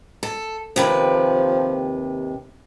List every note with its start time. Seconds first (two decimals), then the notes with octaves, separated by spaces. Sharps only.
0.23 A4
0.76 D#2 C3 F3 B4